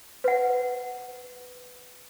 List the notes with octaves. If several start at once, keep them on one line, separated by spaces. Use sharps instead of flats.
B4 F#5